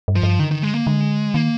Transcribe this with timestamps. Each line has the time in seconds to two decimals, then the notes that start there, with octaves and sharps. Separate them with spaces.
0.08 G2
0.16 F3
0.23 G2
0.39 D3 D#3
0.51 D#3
0.63 G#3
0.75 A#3
0.86 D3 G#3
1.34 D#3 A#3